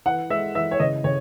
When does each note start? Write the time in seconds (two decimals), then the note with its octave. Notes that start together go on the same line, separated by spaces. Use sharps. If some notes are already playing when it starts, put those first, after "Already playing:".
0.06 E3 F#5
0.30 G#3 E5
0.55 E3 E5
0.71 C#5
0.79 C#3 D#5
1.04 C#3 C#5